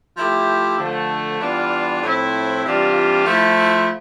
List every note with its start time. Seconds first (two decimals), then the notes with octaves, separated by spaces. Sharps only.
0.17 F3 A3 E4 G4
0.79 D3 F3 A3
1.40 E3 G3 B3 D4 F4
2.03 A2 F3 C4 E4
2.65 C3 E3 G3 D4 F4
3.26 F3 A3 E4